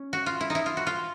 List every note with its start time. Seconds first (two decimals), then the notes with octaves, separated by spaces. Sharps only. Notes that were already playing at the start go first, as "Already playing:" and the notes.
Already playing: C#4
0.13 F#4
0.26 F4
0.41 E4
0.50 D#4
0.55 E4
0.66 F4
0.77 F#4
0.87 F4